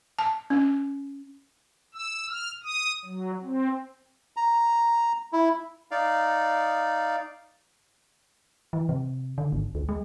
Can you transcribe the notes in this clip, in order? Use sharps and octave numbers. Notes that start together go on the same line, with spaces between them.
A5
C#4
E6
F6
D#6
F#3
C4
A#5
E4
D#4 D5 F5
E3
C3
D3
G#1
D2
G#3